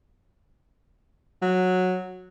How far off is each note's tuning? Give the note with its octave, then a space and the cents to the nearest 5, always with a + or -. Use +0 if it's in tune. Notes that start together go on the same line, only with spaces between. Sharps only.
F#3 -10